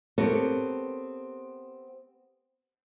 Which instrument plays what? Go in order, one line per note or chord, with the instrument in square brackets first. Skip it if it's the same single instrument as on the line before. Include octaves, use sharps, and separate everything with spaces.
[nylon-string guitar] B3 C4 G4 A4 A#4 C#5